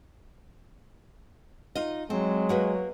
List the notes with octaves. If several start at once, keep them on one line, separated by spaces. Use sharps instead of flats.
D#4 F4 D#5
F#3 G#3 C4
A#3 F#4 B4